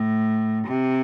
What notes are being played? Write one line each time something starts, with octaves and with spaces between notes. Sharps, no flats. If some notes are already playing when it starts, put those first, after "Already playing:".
Already playing: A2
C3